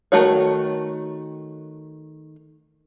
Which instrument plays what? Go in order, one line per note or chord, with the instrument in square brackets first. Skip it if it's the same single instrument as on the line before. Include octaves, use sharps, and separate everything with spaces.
[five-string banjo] D#3 F#3 A3 F#4 C#5